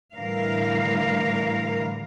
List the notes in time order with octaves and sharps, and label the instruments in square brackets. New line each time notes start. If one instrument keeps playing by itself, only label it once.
[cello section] A2 D3 E3 G3 A#4 F5